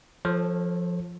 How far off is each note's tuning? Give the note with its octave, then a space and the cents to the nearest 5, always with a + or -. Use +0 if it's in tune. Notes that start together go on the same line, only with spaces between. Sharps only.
F3 +0 A4 +0 C#5 -35